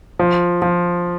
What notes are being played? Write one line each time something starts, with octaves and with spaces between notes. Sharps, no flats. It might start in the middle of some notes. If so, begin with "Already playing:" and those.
F3
F3